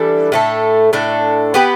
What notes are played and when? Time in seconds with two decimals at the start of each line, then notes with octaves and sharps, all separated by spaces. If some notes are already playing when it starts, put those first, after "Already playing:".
Already playing: E3 G3 D4 A4
0.32 A2 A3 D4 A4
0.93 A2 A3 D4 A4
1.54 B3 G4 B4